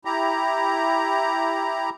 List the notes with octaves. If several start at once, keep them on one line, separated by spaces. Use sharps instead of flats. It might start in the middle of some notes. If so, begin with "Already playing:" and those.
E4 G4 A#5